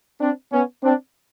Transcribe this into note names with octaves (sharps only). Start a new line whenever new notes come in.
C4 D4
B3 C#4
C4 D4